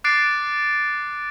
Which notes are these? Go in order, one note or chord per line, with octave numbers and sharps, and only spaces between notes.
D6 F#6 A6 C7 D7